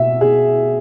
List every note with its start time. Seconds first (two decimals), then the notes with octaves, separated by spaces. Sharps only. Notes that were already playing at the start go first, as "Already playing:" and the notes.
Already playing: B2 E5
0.21 G#4